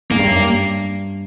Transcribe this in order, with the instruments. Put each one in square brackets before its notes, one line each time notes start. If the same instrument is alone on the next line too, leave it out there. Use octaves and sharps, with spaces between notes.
[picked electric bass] G#2 [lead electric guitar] A#3
[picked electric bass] G2
F#2
G2